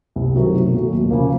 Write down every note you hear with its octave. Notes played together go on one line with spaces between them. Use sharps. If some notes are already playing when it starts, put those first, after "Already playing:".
C2
C3 D#3 F#3 A3
B1
A#2 F#3 A3
D#2
C#3 F3 A#3